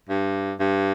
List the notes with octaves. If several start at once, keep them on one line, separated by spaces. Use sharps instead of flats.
G2
G2